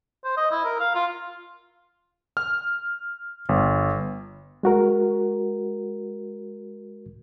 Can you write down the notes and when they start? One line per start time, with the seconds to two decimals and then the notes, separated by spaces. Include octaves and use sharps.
0.25 C5
0.37 D#5
0.51 E4
0.65 A#4
0.80 F5
0.95 F4
2.37 F6
3.49 G1
4.63 G#3 F#4 A#4